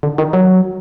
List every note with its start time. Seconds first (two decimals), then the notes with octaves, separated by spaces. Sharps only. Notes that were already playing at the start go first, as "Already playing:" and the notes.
0.03 D3
0.18 D#3
0.33 F#3